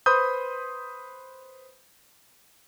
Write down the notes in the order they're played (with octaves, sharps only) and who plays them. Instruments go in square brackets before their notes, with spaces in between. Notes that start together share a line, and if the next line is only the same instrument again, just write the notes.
[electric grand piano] B4 C5 B5 C6 D#6 G6